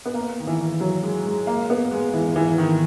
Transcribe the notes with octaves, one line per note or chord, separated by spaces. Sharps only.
B3
A#3
D#3
E3
F#3
G#3
G#3
A#3
B3
G#3
E3
E3
D#3